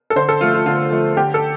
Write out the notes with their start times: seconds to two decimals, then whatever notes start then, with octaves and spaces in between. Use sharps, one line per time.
0.10 A4
0.16 D3 C5
0.29 A4
0.41 F3 A3 F4
0.54 F4
0.66 D3 F4
0.91 F3 A3
1.17 D3 G4
1.34 A4